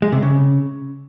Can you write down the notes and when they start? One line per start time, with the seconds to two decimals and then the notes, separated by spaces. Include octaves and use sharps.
0.02 G#3
0.12 C3
0.22 C#3